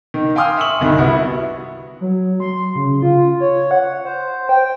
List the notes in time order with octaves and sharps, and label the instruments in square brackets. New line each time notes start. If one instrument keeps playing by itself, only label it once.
[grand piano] D#3
F5 G5 G#5 C6 D#6 F6
E5 C#6 E6 F#7
G1 C2 D#3
G3 B3 E4 F#4
[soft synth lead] F#3
C6
C#3
F4
C#5
F#5
C5
G5